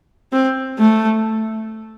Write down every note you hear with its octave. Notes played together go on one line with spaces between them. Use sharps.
C4
A3